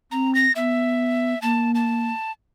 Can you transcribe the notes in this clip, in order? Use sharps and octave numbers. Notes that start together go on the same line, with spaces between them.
C4 A#5
A#6
B3 E5
A#3 A5
A5